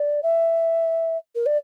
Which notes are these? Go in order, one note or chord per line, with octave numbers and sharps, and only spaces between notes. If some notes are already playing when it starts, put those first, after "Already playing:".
Already playing: D5
E5
A#4
D5